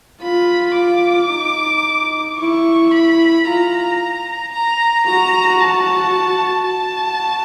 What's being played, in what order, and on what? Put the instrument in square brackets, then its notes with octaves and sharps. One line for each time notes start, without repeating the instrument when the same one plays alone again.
[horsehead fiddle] F4 [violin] B5
[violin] D6
[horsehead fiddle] D#4
[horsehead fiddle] E4 [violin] C#6
[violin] B5
[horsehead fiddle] F4 [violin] A#5
[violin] A#5
[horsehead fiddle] F#4 [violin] A#5
[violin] A5
[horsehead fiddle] F#4 [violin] A5